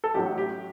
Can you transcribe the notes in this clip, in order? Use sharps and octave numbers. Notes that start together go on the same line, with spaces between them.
A4
A1 A2 F#3 G4
G4